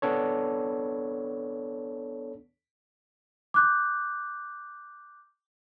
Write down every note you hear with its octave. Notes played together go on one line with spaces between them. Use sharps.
B3 D4 A4 C#5
D6 F#6 G6